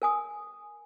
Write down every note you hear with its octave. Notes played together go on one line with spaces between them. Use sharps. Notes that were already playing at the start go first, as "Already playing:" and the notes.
A#4 G#5 D#6